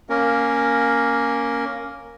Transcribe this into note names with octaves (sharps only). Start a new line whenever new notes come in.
A#3 C#4 A#4